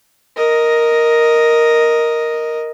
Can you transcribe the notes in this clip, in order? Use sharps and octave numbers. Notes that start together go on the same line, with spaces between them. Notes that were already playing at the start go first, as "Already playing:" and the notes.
A#4 D#5